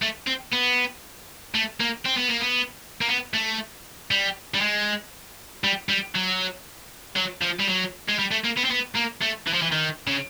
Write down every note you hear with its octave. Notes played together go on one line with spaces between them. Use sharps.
A3
C4
B3
A3
A#3
C4
B3
A#3
B3
A#3
B3
A3
G3
G3
G#3
G3
G3
F#3
F#3
F3
G3
F#3
G#3
G3
A3
A#3
B3
C4
B3
A#3
A3
E3
F3
E3
D#3
C#3